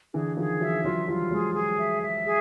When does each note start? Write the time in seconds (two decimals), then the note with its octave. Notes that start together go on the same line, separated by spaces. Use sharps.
0.14 D3 E3 G#4
0.37 D#3 F3 G#4
0.60 E3 F#3 E5
0.84 E3 F#3 F4
1.07 F3 G3 F4
1.31 F#3 G#3 G#4
1.55 G#4
1.79 E5
2.02 E5
2.25 G#4